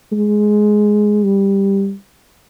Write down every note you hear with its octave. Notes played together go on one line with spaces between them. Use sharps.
G#3
G3